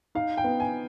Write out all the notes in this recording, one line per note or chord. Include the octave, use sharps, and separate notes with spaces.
D#4 F5
G5
B3
G#5